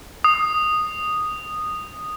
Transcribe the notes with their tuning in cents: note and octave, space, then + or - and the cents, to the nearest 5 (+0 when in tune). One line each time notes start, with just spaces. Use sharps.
D#6 -10